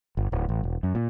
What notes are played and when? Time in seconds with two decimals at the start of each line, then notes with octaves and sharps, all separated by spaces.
0.17 G1
0.32 D1
0.49 A1
0.63 E1
0.83 F#2
0.95 A#2